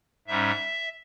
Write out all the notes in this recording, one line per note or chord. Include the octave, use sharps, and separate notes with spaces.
G#2 G3 C#4 E5